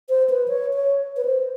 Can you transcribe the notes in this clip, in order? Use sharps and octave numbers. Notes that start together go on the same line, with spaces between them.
C5
B4
C#5
C#5
B4
C5